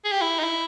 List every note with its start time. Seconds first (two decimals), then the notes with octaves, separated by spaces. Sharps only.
0.05 G#4
0.12 G4
0.21 E4
0.39 D#4
0.44 E4